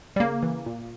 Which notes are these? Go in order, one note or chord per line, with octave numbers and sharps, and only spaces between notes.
G3
C#3 A#3
E3
A#2